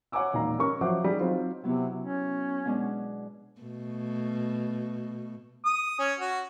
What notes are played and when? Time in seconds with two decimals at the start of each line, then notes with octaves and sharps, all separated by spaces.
0.12 C#5 F#5 G#5 A#5 D6 E6
0.33 E1 A#2 D#3 F5 A#5
0.58 C#4 G4 A#4 C#6 F6
0.81 F3 F#3 C5 E5 F#5 D6
1.04 D#3 G3 G4 G#4
1.19 F#3 C4 D#4 F4 C5
1.64 C3 F#3 B3 E4
2.00 C#4
2.65 B2 G#3 D4
3.61 B2 A3
5.66 D#6
5.99 C#4
6.19 F#4